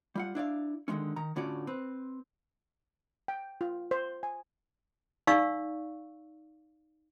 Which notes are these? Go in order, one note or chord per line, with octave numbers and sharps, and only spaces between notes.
G3 F4 F#5
D4 E4 D5 F5
D3 D#3 F#3 G#3 C#4
D#3 A#5
A2 D3 C#4 F4 F#4 D5
C4 B4
G5
F4
C5
G#5
D#4 D5 F5 C#6 E6